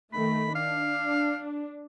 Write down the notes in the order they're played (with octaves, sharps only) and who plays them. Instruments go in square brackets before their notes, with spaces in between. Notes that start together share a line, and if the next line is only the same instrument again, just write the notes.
[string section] D#3 A3 [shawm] B5
[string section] D4 [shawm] F5